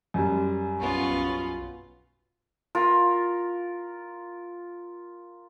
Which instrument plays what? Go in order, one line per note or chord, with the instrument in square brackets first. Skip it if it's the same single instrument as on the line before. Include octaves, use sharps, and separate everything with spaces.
[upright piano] F#2 G3
[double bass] B1 C#4 [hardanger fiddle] B3 F4
[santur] F4 A#4